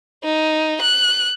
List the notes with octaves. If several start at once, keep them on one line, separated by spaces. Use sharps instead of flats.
D#4
F#6